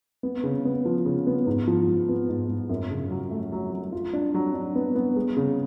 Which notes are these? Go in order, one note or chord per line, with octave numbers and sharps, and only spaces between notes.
B3
C#3
B3
F3
C#3
B3
G#2
F3
G#2
B3
G#2
G#2
F#2
C#3
F#3
A3
F#3
F#3
F4
D4
F#3
D4
B3
B3
G#3
C#3